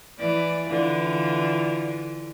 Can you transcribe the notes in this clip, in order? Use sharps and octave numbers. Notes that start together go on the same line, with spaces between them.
E3 D5
D3 E3 F4